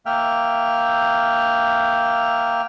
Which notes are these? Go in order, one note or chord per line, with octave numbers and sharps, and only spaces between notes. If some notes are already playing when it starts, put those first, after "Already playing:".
A#3 E5 G5 F6